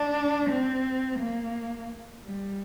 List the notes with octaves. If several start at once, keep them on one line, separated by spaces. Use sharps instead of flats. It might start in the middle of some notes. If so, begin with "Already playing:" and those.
Already playing: D4
C4
A#3
G3